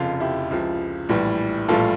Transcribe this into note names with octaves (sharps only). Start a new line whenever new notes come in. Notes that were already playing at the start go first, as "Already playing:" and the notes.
Already playing: F1 F2 C#3 F4
E4 G4
C#2 C#3 F3
A#1 A2 E3 G3
A#1 A2 E3 G3 F4 A4